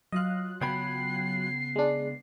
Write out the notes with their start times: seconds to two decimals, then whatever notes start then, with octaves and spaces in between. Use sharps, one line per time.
0.12 F#3 F4 D#5 F5 F#6
0.61 C#3 B3 G5 B5 G#6 C7
1.76 G#3 D4